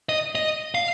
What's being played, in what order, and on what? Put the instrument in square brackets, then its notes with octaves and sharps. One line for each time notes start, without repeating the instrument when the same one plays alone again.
[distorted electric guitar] D#5
D#5
F5